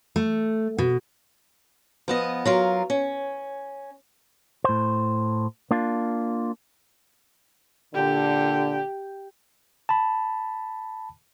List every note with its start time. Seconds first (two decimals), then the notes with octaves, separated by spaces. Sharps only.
0.16 A3
0.78 B2
2.08 F3 B3 D#5
2.45 F#3 F4 A#4
2.90 C#4
4.64 A2 C5
5.71 A#3 D4 F4
7.95 A#2 D3 G4
9.89 A5 B5